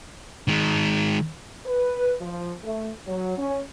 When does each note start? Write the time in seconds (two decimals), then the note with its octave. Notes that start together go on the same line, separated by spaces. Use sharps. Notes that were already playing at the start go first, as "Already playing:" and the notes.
0.48 D#3 G#3
1.66 B4
2.21 F3
2.63 A3
3.07 F#3
3.38 C#4